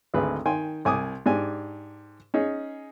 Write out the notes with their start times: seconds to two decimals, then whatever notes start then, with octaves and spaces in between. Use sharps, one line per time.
0.14 G#1 D2 G#4 B4
0.45 D#3 G5 G#5 C6
0.85 C2 G#5 D6 D#6
1.26 G#2 D4 G4 G#5
2.34 C#4 D#4 G#4